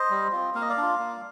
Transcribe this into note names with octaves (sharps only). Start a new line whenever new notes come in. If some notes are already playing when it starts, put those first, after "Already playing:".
Already playing: C5 D#5
G3
C4 F4
A#3 F5
D#5
D5 F5
D4 F4
A#3